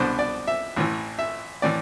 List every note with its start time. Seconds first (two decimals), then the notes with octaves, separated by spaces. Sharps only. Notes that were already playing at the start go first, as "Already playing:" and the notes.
Already playing: C2 B2 B3 D4 C5
0.19 D5
0.47 E5
0.76 A1 A2 E3
1.19 E5
1.62 A2 E3 D5